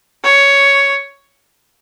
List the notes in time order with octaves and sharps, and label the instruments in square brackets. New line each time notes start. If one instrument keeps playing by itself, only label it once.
[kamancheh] C#5